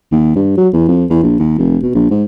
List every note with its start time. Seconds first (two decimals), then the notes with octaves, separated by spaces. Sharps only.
0.12 D#2
0.36 G2
0.58 F#3
0.73 E2
0.88 F2
1.10 E2
1.23 A#1
1.39 D#2
1.58 F1
1.83 B2
1.95 A#1
2.11 G#2